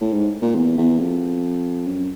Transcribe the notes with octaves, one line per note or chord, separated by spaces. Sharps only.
A2
G#2
A#2
E2
E2
F2
F#2